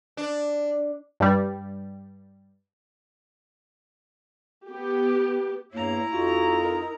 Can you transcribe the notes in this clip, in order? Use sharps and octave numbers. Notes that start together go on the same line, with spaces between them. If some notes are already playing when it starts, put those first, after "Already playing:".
D4
G2 G3
B3 G4
E2 G2 A#3 E4 C#5 A#5
F2 D#4 F4 F#4
A#4